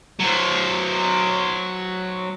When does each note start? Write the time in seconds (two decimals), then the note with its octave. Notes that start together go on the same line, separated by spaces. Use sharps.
0.20 F#3 C5